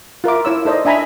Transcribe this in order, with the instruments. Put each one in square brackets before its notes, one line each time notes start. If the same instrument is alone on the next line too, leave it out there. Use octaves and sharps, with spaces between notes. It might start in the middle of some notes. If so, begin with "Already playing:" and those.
[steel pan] F4 A#4 E5 D6
E4 C#5 E6
D#4 A4 C5 D5 D#5
D4 E5 G#5 A#5 B5